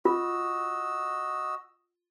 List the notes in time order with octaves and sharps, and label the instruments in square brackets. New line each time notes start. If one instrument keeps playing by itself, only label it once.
[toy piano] F4 [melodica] F#4 D#5 E6